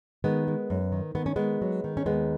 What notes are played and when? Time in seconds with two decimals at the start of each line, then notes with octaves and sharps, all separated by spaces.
0.24 D#3 G#3 B3
0.48 G#3
0.70 F#2
0.92 D#3
1.15 D#3 B3
1.26 C#4
1.36 D#3 G#3 B3
1.62 F#3
1.84 D#3
1.97 C#4
2.06 D#2 G#3 B3